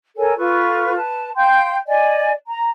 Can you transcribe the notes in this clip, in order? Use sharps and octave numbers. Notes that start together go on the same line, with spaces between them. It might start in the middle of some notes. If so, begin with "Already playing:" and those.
A4 A#4 C#5 G#5
F4 A4 B4 C#6
B4 A5
F5 G5 C6 G6
D5 D#5 G#5
A#5